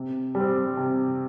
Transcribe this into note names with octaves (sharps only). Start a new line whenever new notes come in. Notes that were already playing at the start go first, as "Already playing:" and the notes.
Already playing: C3
G3
C4
C3